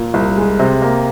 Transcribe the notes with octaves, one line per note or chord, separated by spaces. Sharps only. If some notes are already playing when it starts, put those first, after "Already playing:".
Already playing: A#2
C2
G#3
C3
A#3